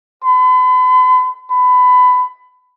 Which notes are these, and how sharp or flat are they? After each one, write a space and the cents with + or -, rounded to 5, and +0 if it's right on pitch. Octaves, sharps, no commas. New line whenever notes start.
B5 +45
B5 +20